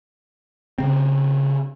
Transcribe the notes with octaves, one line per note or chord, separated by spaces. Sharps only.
C#3 C4